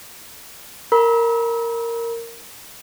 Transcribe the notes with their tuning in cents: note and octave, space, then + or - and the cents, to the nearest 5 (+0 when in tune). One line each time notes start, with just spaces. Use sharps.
A#4 -10 B5 -40